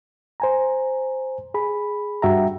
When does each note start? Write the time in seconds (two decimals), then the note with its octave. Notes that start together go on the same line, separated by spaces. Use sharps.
0.40 C5 G#5 A#5
1.54 G#4 B5
2.22 G2 F#4 E5 G5 A#5